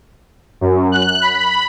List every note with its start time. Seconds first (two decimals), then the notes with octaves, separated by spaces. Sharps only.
0.61 F#2
0.92 F#6
1.22 B5